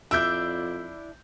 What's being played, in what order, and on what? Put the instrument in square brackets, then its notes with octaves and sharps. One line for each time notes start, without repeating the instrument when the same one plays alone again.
[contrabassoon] F2 [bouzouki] D4 E4 D5 [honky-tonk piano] E6 G6